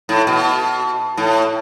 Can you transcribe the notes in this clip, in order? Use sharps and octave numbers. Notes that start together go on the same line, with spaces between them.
A2
B2
A2